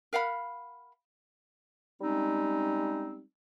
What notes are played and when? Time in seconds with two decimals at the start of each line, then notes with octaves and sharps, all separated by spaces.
0.13 A#4 F5 F#5 B5
2.01 G3 G#3 C4 C#4 D#4